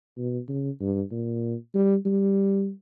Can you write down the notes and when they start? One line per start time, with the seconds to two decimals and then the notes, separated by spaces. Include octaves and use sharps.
0.18 B2
0.49 C#3
0.80 G2
1.11 A#2
1.74 G3
2.06 G3